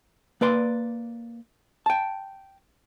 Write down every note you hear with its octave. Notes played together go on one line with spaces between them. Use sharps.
A#3 B4 D5 C6
G5 A5